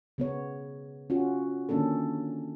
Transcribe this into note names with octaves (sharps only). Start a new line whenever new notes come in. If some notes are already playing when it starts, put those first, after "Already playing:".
C#3 B3 C#5
C#4 F4 F#4
D3 D#3 A#3 C#4 D4 A4